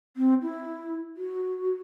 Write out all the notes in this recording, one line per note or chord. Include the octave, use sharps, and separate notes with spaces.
C4
E4
F#4